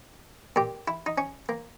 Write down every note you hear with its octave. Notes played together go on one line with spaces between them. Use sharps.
A#2 G4
E4
D#4
C#4
A#3